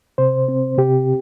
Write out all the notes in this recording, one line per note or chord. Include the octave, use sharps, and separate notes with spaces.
C3 C5
C4
C3 G4